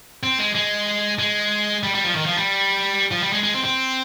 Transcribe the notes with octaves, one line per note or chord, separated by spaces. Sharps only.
C4
G#3
G#3
G#3
G3
G3
F3
D#3
F3
G3
F3
G3
G#3
G#3
C4
C4